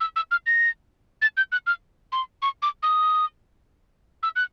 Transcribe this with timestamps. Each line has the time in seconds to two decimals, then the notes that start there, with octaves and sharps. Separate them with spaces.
0.01 E6
0.16 E6
0.31 F6
0.46 A#6
1.22 A6
1.37 G6
1.52 F#6
1.67 F6
2.12 C6
2.42 C#6
2.62 D6
2.83 D#6
4.23 E6
4.36 F#6